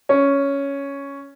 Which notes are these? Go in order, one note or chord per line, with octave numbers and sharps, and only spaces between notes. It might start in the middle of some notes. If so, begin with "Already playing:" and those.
C#4